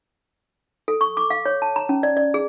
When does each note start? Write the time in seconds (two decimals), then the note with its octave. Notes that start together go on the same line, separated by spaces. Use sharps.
0.88 A4
1.01 C#6
1.17 D6
1.30 F5
1.46 C#5
1.62 A5
1.76 A#5
1.89 C#4
2.03 D5
2.17 D5
2.34 G#4